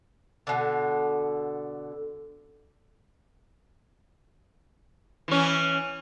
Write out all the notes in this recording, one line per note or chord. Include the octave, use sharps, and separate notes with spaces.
B2 D3
E3 C#4